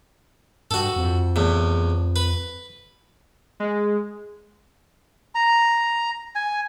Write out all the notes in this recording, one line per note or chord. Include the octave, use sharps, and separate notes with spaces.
G2 F#4 A4
F2
E2 A2
B4
G#3
A#5
G#5